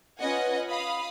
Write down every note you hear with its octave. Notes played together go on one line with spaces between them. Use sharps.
C#4 F4 B4 D#5 F#5 G#5
F5 B5 D#6